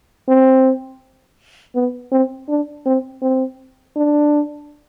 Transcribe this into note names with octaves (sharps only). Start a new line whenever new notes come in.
C4
B3
C4
D4
C4
C4
D4